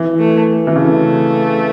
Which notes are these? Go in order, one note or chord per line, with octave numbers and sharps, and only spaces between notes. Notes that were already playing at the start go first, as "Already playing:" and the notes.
Already playing: E3
A3
E3
C#3 A3